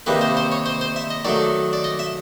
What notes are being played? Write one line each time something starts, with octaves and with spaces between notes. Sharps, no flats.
C3 D#3 G3 A#3 B4
C5
C5
C#5
C5
C5
E5
D#5
D#3 F#3 A3 D5
D5
D#5
E5